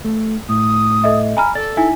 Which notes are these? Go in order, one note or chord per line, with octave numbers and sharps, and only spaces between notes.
A3
A2 D#6
A4 D#5 E5
G#5 A#5 B5 F6
A4 D5 A6
D#4 E4 E5 G#5